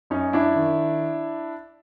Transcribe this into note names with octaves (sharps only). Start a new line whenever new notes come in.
F#2 C#4 D#4
D4 E4
D#3